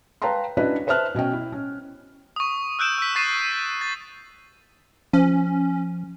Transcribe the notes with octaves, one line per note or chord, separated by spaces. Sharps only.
B4 F5 G5 A5 A#5 C6
C#4 D4 E4 F#4 B4 D#5
B4 C5 E5 A5 F6 F#6
B2 C#4 D#5 G5
E4
C#4
C#6 D#6
E6 F#6 G6 D7 E7
E6 B6
C#6 A6 C7 D#7 E7
B6
A6
F3 C#4